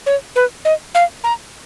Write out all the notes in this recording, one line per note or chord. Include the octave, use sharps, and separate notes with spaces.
C#5
B4
D#5
F5
A#5